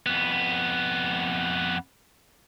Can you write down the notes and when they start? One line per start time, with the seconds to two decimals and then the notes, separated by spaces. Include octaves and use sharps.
0.06 F2 B3